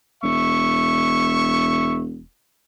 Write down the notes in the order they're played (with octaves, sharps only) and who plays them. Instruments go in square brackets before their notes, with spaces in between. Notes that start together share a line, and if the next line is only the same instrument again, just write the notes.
[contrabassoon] E1 [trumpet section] E5 C#6